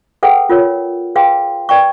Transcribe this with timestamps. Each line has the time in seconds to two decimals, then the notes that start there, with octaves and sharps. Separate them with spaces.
0.23 G#4 A4 B4 F#5 G5
0.49 F4 A#4 C#5
1.15 G#4 B4 F5 G5 C6
1.69 B4 D5 G5 C#6